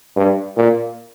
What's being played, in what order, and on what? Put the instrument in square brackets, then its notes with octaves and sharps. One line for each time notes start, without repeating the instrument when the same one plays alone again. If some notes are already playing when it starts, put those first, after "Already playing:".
[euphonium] G2
A#2